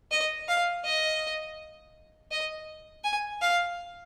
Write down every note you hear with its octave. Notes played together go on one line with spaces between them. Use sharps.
D#5
F5
D#5
D#5
G#5
F5